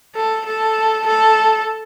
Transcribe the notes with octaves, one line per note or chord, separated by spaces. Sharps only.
A4
A4
A4